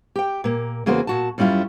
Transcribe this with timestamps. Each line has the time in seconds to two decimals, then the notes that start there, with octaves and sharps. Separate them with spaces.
0.16 G4 G5
0.44 A#2 A#3
0.86 E2 C#3 A#3 F#4 G#4 C5
1.07 A#2 F#4 A5
1.38 F#2 G3 C#4 E4 F4